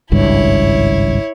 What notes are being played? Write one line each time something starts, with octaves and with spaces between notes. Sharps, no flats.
G#1 C#2 G2 E4 C#5